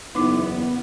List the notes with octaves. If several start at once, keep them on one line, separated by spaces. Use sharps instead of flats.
F#1 E2 B3 D#4 E4 D6